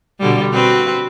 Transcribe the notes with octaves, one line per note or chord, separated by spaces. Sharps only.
B2 D3 G3
C4 F#4 B4